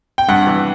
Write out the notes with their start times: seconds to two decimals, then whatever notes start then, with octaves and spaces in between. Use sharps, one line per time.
0.18 G5
0.29 G2 F#5
0.47 E3